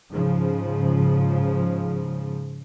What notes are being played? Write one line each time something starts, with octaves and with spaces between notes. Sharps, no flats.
G#2 C#3 F3